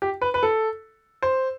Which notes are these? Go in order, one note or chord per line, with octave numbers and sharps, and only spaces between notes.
G4
B4
B4
A4
C5